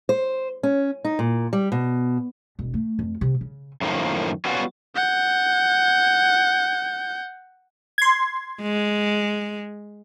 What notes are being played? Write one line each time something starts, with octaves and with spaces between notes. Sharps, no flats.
C5
C#4
D#4
A#2
G3
B2
E1
A3
F2
C3
C#3
F#2 A2 D#3 F3 A#3
F#3 G3 B3 C#4 F4 F#4
F#5 G6
C6 G#6
G#3